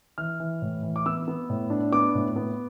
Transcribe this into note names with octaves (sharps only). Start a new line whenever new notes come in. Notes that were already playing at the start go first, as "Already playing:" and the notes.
E3 F6
E3
A2
E3
D6
B3 E6
B3
A2
D4
B3 D6
A2
B3